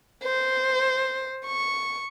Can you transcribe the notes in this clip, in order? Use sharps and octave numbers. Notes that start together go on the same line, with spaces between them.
C5
C#6